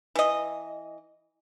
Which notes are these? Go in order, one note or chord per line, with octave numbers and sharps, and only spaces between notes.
E3 D#5